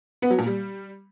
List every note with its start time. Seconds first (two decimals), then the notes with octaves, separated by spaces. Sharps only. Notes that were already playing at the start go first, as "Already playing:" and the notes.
0.22 B3
0.30 F#3
0.38 A#2
0.46 G3